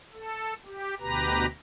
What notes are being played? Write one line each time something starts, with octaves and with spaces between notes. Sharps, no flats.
A4
G4
D2 B2 G4 B4 A#5